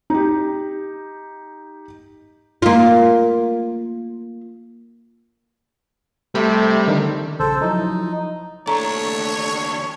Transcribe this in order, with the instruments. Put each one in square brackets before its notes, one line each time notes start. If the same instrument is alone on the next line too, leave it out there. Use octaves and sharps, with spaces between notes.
[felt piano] D#4 G4
[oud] A#3 F4
[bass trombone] C3 [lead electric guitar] G3 [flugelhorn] A3 [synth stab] B5
[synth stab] D3 D#3
[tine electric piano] A#1 C#3 [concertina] A4 C5
[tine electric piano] F3 F#3 E4 [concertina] D#4
[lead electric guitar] D#2 D4 [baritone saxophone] A3 [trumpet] C#5 [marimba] A#5